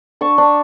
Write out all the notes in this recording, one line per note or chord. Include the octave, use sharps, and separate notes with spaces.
D4 A5 C#6
D4